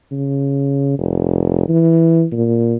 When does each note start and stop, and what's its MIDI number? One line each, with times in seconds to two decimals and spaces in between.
0.12 0.95 49
0.98 1.68 29
1.69 2.24 52
2.32 2.77 46